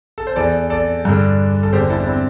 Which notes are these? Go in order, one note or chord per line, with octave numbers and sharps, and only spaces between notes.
A4
C5
E2 E3 A4 D5
A4 D5
G2 D3
A4
E2 D3 G4 C5
E4 A4
D4
C4 E4